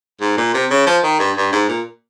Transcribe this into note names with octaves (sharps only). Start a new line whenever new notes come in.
G#2
A#2
C3
C#3
F3
D#3
G2
G2
G#2
A#2